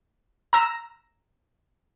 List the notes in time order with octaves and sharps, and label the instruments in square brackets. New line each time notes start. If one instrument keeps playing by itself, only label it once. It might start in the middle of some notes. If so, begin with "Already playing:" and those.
[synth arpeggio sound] A#5 E6 A#6